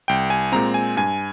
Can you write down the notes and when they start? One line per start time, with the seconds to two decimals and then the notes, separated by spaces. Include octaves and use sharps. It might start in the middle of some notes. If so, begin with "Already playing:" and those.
0.08 C2 G5
0.30 G#5
0.52 A#2 G#3 C4 A#5
0.74 G#5
0.97 G2 G#5